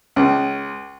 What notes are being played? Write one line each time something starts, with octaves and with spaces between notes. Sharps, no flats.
C#2